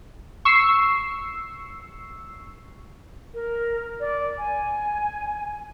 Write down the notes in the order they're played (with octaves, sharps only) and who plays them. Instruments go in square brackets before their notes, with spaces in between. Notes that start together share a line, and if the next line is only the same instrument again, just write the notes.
[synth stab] C#6 E6 C7
[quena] A#4
D5
G#5